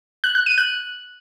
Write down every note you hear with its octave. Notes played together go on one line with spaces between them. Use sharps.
F#6
F#6
D#7
F#6